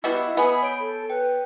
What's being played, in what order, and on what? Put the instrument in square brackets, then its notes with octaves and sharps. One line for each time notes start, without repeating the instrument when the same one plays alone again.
[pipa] G3 B3 F#4 [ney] E4 [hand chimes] D#5 F#5 E6
[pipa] B3 G#4 [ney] B5
[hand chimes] C#5 D7
[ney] A4
[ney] B4 [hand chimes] G5